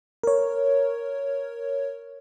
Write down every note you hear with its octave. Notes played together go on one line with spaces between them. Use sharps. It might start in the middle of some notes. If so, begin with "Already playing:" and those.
A#4 C#5